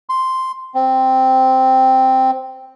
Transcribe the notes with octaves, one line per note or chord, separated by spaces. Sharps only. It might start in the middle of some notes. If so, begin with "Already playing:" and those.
C6
C4